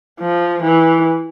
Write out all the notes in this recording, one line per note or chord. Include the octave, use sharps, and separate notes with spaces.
F3
E3